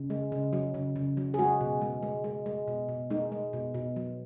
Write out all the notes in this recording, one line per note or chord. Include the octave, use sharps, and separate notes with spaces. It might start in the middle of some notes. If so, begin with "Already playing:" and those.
Already playing: C#3
G#3
C#3
F#3
C#3
C#3
F#3
G#4
G#3 F#4
B2
G#3
G#3
G#3
G#3
B2
B2
G#3 D#4
G#3
B2
B2
F#3